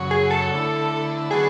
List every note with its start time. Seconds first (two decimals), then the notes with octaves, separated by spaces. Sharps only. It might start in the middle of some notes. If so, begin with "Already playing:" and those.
Already playing: F#2 C#3 F#3
0.11 G#4
0.31 A4
0.51 D3 A3 E4
1.31 D3 F#3 B3 F#4 G#4 A4